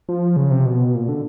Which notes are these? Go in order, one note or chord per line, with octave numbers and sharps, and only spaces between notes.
F3
C#3
C3
B2
A#2
D3